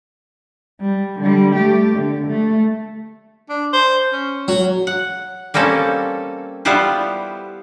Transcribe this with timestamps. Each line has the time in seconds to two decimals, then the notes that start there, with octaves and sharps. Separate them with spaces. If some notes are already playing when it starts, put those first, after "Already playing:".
0.81 G3
1.20 D3 G3
1.55 A3 G4
1.96 D3
2.28 A3
3.49 D4
3.73 C5
4.13 C#4
4.48 F#3
4.87 F#5
5.54 G3 A#3 C4 C#4 A4
6.65 G3 B3 E4 F4 G4 C5